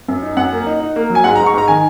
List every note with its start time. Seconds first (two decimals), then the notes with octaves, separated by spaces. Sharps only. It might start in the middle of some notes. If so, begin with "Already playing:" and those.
0.08 F#2
0.23 D#4
0.37 F#2 F#5
0.52 A#3
0.67 D#4
0.80 D#4
0.96 A#3
1.10 F#3
1.15 G#5
1.24 G#2 F#5
1.36 A#5
1.40 G#2
1.46 C#6
1.54 G#2 A#5
1.68 D#3 G#5